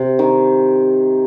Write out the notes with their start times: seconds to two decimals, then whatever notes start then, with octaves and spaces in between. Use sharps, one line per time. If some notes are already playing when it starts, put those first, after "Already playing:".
Already playing: C3
0.19 D#3